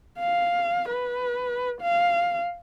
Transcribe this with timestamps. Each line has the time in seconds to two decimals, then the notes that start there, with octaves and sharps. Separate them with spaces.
0.20 F5
0.89 B4
1.81 F5